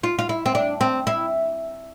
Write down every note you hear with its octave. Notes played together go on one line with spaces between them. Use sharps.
F4
F4
E4
C4
D4
C4
E4